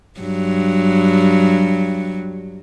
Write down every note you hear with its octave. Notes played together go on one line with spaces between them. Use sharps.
G2 F#3